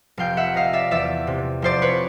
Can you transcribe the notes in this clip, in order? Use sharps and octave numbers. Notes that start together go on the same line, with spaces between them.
F1 F5 G5
E5 F#5
C3 D#5 F5
D5 E5
E2 D5 E5
C3
F1 C5 D5
B4 C#5